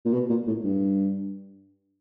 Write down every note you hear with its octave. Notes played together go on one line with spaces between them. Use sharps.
A#2
B2
A#2
A2
G2